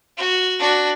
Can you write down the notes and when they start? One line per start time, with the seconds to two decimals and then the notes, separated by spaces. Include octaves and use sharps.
0.17 F#4
0.59 D4 F#4